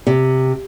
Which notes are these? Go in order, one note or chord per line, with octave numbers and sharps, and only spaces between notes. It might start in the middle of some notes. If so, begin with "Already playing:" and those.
C3